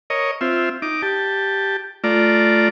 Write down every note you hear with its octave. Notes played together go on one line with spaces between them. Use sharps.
A#4 C#5 D#5
C4 F4 E5
D#4 D6
G4 A5
A3 F4 D5 A#5